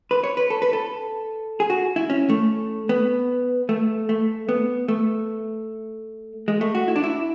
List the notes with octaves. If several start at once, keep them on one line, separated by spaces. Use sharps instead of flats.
B4
C#5
B4
A4
B4
A4
G#4
F#4
E4
C#4
A3
B3
A3
A3
B3
A3
G#3
A3
F#4
E4
D4
E4